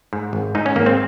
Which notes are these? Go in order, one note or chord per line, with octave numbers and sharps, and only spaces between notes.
G#2
G#1
G#2 D#4
C#4
G#1 A#3
C4